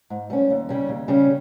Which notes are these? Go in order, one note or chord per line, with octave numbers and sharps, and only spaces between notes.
G#2
G3 C#4
D#2
C#3 G3 C#4
D#2
C#3 G3 C#4